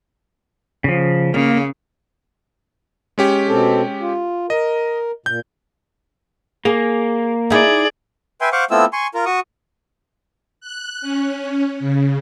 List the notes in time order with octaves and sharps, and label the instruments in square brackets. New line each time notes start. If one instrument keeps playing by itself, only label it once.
[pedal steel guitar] C#3 F3
[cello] C#3 [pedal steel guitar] A#3
[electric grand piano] G#3 C#4 G4
[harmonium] B2 C4 A4
F4
[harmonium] A#4 [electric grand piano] D#5
[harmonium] A#2 [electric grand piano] G6
[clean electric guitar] A#3 [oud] G#4
[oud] D#4 E4 [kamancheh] G#4 D5
[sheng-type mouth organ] B4 E5 G5 G#5 C6
C5 F5 F#5 C#6 D6
A3 B3 C4 E4 F4 E6
G#5 C6 C#6
F4 A#4
F#4 C#6 D#6
[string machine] F#6
C#4
C#3